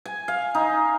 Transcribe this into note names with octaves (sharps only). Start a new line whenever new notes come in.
G#5
F5
D#4